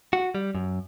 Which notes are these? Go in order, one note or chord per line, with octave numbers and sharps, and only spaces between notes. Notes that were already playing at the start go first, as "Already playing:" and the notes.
F#4
G3
F#2